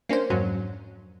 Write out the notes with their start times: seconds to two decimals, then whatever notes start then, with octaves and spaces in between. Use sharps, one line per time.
0.09 A#3 C#4 D4 C5
0.30 F2 G#2 F#3 C#4